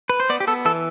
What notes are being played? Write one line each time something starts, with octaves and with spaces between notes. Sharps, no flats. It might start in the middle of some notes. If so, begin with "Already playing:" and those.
B4
C5
B3 D5
G4
B3 A4
E3 A4